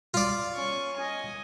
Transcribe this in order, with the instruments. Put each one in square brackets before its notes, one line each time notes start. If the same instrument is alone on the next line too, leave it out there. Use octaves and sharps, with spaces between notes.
[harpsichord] F4 D5
[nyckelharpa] C#4 C#6
D#5 G#5